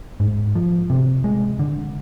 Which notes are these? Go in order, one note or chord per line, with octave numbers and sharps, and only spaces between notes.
G#2
F3
C3
G#3
D3